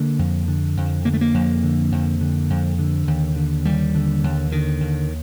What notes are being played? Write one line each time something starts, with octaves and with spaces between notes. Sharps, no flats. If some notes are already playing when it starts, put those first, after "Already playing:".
Already playing: D3 A#3
F2
D3
F2
D3 A#3
A3
A#3
F2
D3
F2
D3
F2
D3
D#2
D3
D#2 G3
D3
D#2
D3 D#3
D#2